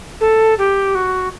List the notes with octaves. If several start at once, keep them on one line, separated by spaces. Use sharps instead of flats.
A4
G4
F#4